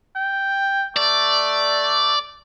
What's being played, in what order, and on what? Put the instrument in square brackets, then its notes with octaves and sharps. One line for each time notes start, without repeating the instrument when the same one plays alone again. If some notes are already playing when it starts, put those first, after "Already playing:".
[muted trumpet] G5
[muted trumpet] A3 [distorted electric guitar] D5